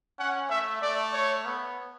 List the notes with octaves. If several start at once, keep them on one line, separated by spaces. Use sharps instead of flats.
C#4 F#5
A3 E5
A3 D5
C#5
B3